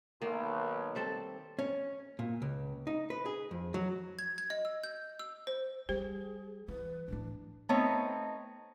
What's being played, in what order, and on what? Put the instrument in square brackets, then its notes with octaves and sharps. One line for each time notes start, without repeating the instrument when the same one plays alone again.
[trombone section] B1 [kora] D#3 A#3
[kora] G3 C4 A4
[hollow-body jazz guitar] C#4
A#2
C#2
D#4
B4
G#4
F2
F#3
[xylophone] G#6
G#6
D#5
E6
G6
E6
C5
[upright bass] G3 [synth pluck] G4 [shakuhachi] G#4 [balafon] C5
[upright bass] E3 [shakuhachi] B4
[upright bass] A2 E3 [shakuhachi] D4
[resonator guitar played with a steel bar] A3 B3 C4 D#4 C#5 D#5